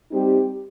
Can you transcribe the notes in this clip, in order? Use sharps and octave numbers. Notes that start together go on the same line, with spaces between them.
G3 C4 D#4 G4